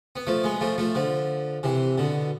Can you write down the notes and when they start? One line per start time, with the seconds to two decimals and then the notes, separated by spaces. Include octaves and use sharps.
0.16 B3
0.27 F3 A3
0.44 G#3 B3
0.61 F3 A3
0.78 F3 A3
0.95 D3 F3
1.63 C3 E3
1.98 B2 D3